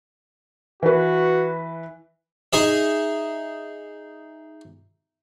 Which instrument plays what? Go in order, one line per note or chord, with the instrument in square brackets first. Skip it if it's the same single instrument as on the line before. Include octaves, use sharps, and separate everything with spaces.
[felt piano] E3 B4 [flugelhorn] F#4
[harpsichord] D#4 G#4 E5